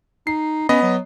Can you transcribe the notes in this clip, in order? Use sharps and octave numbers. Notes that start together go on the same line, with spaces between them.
D#4 C7
B3 C#4 D#5 B5
F#3